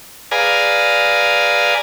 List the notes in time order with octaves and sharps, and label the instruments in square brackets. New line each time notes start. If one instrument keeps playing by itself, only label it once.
[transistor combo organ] G#4 B4 D5 F5 G#5 A#5